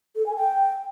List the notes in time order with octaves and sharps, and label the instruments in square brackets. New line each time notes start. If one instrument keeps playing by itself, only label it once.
[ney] A4
G#5
G5